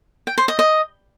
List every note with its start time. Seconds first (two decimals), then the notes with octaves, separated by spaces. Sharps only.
0.27 G5
0.38 C5
0.48 D#5
0.59 D#5